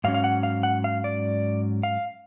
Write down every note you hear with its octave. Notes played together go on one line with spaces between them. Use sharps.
G#2 F#3 C#4 F5
F5
F#5
F5
F#5
F5
D5
F5